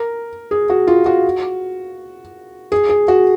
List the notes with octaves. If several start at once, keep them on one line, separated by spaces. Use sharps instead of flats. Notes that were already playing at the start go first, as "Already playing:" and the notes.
Already playing: A#4
G#4
F#4
F4
F#4
G#4
G#4
F#4